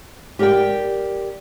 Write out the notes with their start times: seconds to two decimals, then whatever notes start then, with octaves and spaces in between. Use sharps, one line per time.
0.39 G4 A#4 D5 F#5 G5